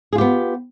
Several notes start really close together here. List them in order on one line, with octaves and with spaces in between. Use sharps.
G#4 F4 G4 B3